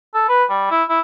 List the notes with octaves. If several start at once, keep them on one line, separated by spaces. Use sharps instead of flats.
A4
B4
G3
E4
E4